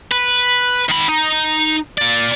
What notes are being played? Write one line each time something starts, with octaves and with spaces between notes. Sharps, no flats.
B4
D#3 B5
D#4
A#2 D5